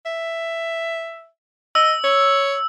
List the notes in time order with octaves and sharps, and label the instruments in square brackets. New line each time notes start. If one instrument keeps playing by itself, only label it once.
[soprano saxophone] E5
[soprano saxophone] D#5 [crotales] E6
[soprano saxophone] C#5